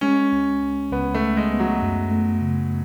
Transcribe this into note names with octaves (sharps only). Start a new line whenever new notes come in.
G#3 C#4
C#2
C#2
C#2 B3
A3
B3
G#3
B3
F#3
F#2
A3
C#3